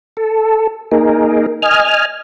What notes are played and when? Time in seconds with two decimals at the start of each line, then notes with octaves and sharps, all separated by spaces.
0.17 A4
0.92 A#3 D#4 G#4 A#4
1.62 D#5 G#5 F6